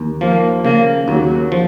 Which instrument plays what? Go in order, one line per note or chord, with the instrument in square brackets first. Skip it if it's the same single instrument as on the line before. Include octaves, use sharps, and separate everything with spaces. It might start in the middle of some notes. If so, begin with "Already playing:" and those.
Already playing: [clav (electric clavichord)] D#2
[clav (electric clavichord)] F3 [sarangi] A#3
[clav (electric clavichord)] C#3 [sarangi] A#3
[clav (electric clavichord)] D#2 [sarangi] F#3
[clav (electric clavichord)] F3